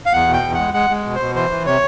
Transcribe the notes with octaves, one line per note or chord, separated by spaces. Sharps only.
F5
E2 F#5
B2
G5
E2
G#3 F#5
G#3 F#5
G#3
B2
C5
B2
E3 C5
E3
C3 C#5